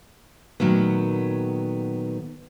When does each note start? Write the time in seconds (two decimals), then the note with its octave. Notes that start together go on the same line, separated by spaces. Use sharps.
0.60 A#2 D#3 F#3 A3 B3